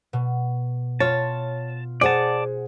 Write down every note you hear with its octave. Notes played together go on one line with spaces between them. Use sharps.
B2
F4 C#5 A5 F6
G#4 C5 D5 F#5 A5